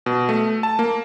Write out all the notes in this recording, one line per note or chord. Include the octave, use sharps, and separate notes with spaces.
B2
A3
A5
A#3